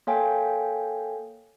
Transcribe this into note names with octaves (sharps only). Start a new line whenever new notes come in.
A#3 A4 C#5 F5 G5 G#5